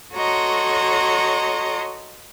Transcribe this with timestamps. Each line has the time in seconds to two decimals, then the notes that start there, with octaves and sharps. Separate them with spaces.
0.14 F#4 A4 C#5 D#5 A#5 C6